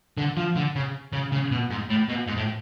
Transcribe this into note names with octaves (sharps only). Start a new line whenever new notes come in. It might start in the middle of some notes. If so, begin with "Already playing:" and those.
D3
F3
D3
C#3
C#3
C#3
B2
G#2
A2
B2
G#2
A2